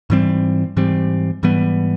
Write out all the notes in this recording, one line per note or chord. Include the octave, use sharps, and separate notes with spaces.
G#2 E3 G3 C4
G#2 E3 G3 C4
G#2 E3 G3 B3